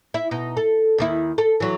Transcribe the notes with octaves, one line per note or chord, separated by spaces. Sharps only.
E4 E5
B2 D#4
A4
D#2 D#3 E4
A4
E3 F#3